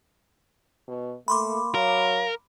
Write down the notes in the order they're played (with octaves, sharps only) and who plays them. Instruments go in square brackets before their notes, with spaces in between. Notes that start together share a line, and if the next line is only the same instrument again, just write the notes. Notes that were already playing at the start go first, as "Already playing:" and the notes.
[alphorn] B2
[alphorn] A3 [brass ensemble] A#3 [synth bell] B5 C6 D6
[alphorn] F#3 [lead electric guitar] A#4 [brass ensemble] F5